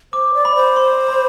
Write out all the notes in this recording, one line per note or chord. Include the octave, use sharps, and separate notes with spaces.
C5 D6
D5
B5
C5
C6
B5